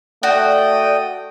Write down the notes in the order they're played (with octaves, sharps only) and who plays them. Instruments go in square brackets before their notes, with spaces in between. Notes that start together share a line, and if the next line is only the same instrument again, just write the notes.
[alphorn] A3 [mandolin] F#4 [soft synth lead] D5 [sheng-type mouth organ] G5 D#6